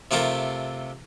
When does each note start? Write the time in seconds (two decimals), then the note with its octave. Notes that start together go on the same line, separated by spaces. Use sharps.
0.11 C3 A3 F4 G4 A4 A#4